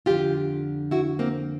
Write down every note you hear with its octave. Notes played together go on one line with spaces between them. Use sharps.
F2 D3 F4 G4
E4 F#4
A#3 C4